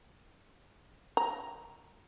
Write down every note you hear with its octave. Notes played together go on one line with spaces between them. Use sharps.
A#5